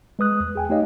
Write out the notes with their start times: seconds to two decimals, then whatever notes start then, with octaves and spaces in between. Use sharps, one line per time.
0.19 G#3 B4 D#6 F#6
0.40 E2
0.55 G#4 G5 G#5
0.69 A3 D#4 G4 C#5 D#5 F5